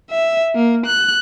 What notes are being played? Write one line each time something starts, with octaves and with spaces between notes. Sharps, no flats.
E5
A#3
F#6